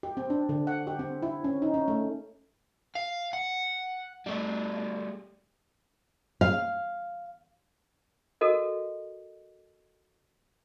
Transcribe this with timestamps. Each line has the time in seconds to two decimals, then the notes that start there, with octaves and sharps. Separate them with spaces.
0.03 G4
0.17 C4
0.30 D4
0.49 D3
0.67 F#5
0.87 G4
0.99 C4
1.23 E4
1.44 C#4
1.62 D#4
1.74 C#4
1.88 A3
2.95 F5
3.33 F#5
4.26 G3 A3
6.41 F5
8.41 F#4 A4 A#4 D#5